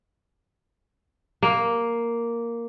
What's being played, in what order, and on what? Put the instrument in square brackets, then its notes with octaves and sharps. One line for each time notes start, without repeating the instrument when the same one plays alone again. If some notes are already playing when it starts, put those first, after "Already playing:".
[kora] A#3